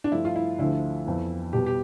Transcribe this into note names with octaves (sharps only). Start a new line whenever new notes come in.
D4
G2 F3 A3 E4
F4
E4
D2 D3 F3 A3 E4
F2 E3 B3
B2 G3 B3 G4
G4